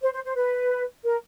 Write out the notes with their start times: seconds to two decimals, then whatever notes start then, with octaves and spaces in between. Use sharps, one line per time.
0.02 C5
0.13 C5
0.24 C5
0.36 B4
1.04 A#4